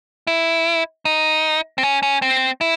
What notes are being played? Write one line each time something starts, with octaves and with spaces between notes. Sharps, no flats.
E4
D#4
C4
C#4
C#4
C4
E4